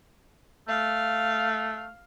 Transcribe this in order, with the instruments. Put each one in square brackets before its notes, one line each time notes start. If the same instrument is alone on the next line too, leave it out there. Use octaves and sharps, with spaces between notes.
[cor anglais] A3 [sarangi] F5